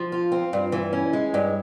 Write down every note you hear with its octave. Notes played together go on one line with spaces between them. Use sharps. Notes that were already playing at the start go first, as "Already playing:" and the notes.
Already playing: F3
F4
C4
G2
E3
C#4
G#3
G2